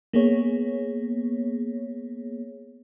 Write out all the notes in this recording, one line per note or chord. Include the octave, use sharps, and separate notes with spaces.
A#3 B3 G#4 C#5